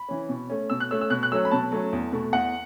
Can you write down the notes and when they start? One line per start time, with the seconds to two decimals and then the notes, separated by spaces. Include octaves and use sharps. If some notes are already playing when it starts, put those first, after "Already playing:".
Already playing: B5
0.08 E3 C#4
0.29 B2
0.50 A3 C#4
0.70 B2 E6
0.80 F#6
0.91 A3 C#4 E6
1.01 E6
1.10 B2 F#6
1.23 F#6
1.32 F#3 A3 C#4 E6
1.45 B5
1.51 B2 A5
1.72 F#3 A3 C#4
1.92 E2
2.12 B2 A3
2.32 E2 F#5